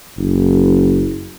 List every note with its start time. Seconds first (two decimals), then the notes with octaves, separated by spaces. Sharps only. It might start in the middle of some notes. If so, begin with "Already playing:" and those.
0.17 F#1